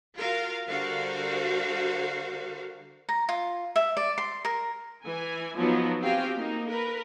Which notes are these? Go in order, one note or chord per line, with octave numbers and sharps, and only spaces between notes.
F4 F#4 A#4 F5
D3 G3 F#4 A#4 C5 F5
A#5
F4
E5
D5
C6
A#4
E3 G#5
F3 F#3 B3 D#4
C4 F#4 G4 F5 G5 G#5
A#3 D#4
A#4 B4